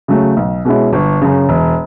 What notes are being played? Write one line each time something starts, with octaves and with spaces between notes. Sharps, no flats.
C#3 F#3 A3
B1
B2 G#3 C#4 E4
G1
F#2 C#3
E1